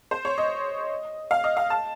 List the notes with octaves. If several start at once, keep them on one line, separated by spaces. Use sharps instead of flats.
C5
C#5
D#5
F5
D#5
F5
A5